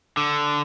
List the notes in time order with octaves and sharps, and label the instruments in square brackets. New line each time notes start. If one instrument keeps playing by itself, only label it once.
[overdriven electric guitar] D3